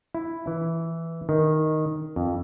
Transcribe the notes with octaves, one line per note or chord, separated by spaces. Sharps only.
E4
E3
D#3
F2